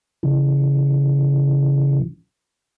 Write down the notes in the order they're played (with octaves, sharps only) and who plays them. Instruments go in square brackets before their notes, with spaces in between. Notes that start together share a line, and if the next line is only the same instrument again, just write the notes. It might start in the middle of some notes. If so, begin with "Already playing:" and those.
[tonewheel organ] C#3 E3